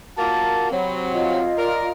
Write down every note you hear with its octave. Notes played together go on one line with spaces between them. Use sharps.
A#2 A#3 F#4 A5
C3 F#3 C4 B5
F4 D#5 F5
A#4 D5